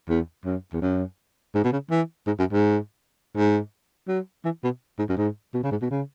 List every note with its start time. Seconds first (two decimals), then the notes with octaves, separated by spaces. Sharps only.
0.09 E2
0.45 F#2
0.73 E2
0.82 F#2
1.55 G#2
1.64 B2
1.72 C#3
1.90 E3
2.27 G#2
2.39 F#2
2.52 G#2
3.36 G#2
4.08 F#3
4.45 E3
4.64 B2
4.99 G#2
5.09 F#2
5.17 G#2
5.54 B2
5.63 C#3
5.71 G#2
5.81 B2
5.91 C#3